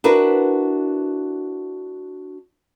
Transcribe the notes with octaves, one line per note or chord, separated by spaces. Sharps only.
D4 E4 F#4 A#4 B4